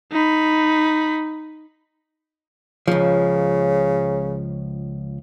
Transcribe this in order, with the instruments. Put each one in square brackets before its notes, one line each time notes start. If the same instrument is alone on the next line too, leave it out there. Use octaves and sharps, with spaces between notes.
[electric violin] D#4 B5
[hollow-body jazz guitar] C#2 F3 [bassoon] C#3